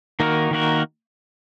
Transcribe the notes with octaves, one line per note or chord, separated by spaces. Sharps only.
D#3 A#3 D#4 F#4 A#4
D#3 A#3 D#4 F#4 A#4